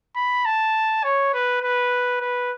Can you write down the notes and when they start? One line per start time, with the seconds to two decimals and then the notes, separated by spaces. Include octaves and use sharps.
0.16 B5
0.45 A5
1.04 C#5
1.34 B4
1.62 B4
2.21 B4